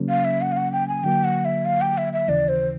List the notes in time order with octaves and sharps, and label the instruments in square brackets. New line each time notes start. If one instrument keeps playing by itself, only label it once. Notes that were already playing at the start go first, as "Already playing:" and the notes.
Already playing: [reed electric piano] C#3 F#3 A#3 C#4
[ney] F5
E5
F#5
F5
F#5
G5
G#5
[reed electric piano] D3 F#3 A#3 [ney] G5
[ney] F#5
E5
F5
G5
E5
E5
[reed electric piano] D#2 C#3 E3 [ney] D5
[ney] C5